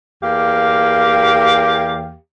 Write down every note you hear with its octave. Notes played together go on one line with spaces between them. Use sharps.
E2 A#3 G4 F5